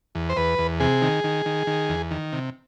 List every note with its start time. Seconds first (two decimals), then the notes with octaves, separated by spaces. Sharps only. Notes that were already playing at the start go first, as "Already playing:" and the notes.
0.15 E2
0.30 C5
0.37 E2 B4
0.59 E2
0.80 C3 G#4
1.02 D#3
1.24 D#3
1.46 D#3
1.67 D#3
1.89 E2
2.11 D#3
2.33 C3